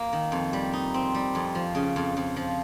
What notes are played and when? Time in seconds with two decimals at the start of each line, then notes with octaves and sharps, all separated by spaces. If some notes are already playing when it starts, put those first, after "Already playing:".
Already playing: A#3 F4
0.13 D#3
0.32 F2
0.53 G3
0.73 D#4
0.94 C4
1.15 G3
1.35 F2
1.55 F3
1.75 C#3
1.96 F2
2.17 F2
2.36 F3